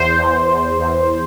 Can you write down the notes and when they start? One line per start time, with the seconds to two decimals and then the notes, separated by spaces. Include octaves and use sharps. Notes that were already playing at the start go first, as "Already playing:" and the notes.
Already playing: E2 C5
0.18 E2
0.49 E2
0.80 E2